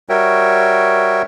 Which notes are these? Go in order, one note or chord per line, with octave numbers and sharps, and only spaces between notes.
G3 F#4 A#4 C#5 E5 G5